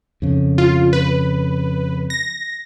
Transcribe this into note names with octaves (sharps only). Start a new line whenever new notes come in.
F2 C#3
F4
B4
A#6